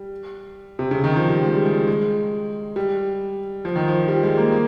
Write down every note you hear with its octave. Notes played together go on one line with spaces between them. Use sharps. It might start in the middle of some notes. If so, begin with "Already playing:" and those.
Already playing: G3
C3
C#3
D#3
F3
G3
G#3
G3
G#3
G#3
G3
F3
D#3
F3
G3
G#3
A#3
A#3